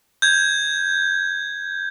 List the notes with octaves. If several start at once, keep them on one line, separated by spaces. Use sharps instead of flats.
G6 G#6